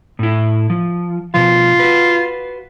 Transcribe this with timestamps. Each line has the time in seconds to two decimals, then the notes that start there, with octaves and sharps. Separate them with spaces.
0.19 A2 E4
0.70 F3
1.34 B2 F3 F4
1.79 F#4 B4